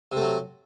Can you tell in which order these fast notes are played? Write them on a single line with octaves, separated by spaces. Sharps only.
C3 A3 F#3